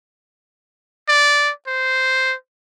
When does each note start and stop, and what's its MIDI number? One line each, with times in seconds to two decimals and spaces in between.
1.09 1.51 74
1.67 2.35 72